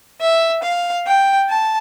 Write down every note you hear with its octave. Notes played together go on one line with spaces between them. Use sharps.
E5
F5
G5
A5